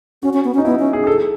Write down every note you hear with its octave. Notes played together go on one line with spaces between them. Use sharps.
C#4 F#4
C#4
B3
C#4
D#4
B3 E4
C#4
G#4
G#4
A4